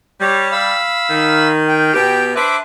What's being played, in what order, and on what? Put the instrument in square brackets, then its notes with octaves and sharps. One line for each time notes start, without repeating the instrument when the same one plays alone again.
[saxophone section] G3 [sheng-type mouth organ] C#5
[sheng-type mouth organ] F5 B5 E6
[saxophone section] D#3
[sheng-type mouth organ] G5
[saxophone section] B2 B3 G4
[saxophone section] D4 B4 [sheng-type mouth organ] C5 E5 D6